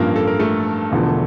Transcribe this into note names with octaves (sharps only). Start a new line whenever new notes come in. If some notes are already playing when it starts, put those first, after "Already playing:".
Already playing: A1 G2 F3 A#3 A#4
A4
A#4
A3 A4
E1 E2 D3 F3